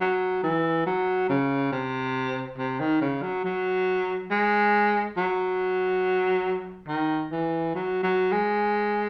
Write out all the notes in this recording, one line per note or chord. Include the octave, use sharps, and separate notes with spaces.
F#3
E3
F#3
C#3
C3
C3
D#3
C#3
F#3
F#3
G#3
F#3
D#3
E3
F#3
F#3
G#3